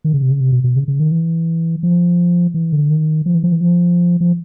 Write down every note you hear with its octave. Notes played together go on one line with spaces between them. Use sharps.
D#3
C#3
C3
C#3
C3
B2
B2
C#3
C#3
D#3
E3
F3
E3
D3
D#3
F3
E3
F3
E3
F3
F3